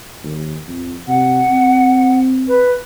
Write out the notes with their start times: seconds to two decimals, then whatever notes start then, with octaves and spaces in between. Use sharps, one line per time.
0.24 D#2
0.68 F2
1.08 C3 F#5
1.51 C4
2.48 B4